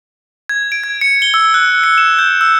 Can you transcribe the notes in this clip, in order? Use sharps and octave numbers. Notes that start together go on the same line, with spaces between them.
G#6
D7
G#6
C#7
G7
E6
F#6
C#7
E7
G6
E6